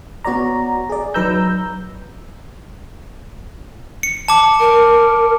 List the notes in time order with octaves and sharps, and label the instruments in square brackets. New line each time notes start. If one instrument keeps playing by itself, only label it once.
[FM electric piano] B3 F#4 C#5 D5 A#5
G#4 D5
F#3 D#4 B4 A#5 E6 G6
[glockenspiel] C#7
A5 D6
[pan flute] A#4